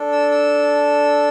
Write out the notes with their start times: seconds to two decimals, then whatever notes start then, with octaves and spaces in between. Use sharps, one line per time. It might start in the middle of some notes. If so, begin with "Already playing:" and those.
Already playing: D4 A4
0.12 E6
0.31 E6